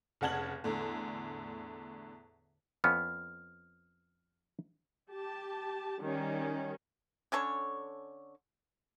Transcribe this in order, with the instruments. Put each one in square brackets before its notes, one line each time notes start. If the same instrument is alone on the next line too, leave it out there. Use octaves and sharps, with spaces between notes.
[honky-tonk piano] F1 C#3 F#5 A5 G#6 F#7
E2 A2 D3
[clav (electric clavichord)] F2 B3 C#4 [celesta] F6
[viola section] G4 A5
D#3 G3 C#4
[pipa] D3 C#4 A4 C#5